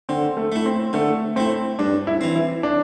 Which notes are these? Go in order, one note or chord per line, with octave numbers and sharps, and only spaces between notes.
D3 C4
A3
A3 E4
C4
D3 A3
A3 C4 E4
G2 D4
E4
E3 C4
E4
D4